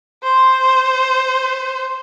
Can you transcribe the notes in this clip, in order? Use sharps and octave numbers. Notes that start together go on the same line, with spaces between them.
C5